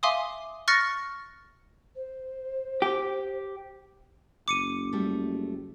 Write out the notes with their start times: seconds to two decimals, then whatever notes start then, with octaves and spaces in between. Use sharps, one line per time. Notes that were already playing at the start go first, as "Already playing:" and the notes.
0.03 E5 F5 G#5 C6 D6 D#6
0.68 C#6 F6 F#6 A6 A#6 C#7
1.95 C5
2.82 G4
4.48 F#1 D6 C#7 D#7
4.93 G3 A3